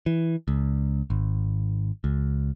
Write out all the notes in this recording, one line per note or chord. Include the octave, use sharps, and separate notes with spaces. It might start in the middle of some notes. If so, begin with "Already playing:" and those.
E3
C#2
G#1
C#2